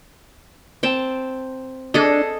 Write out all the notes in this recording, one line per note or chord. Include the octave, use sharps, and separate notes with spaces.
C4 G5 A5
D4 G#4 A4 D#5